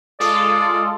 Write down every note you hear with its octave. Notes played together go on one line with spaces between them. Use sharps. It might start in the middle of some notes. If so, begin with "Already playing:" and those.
G#3 F4 A4 D5 D#6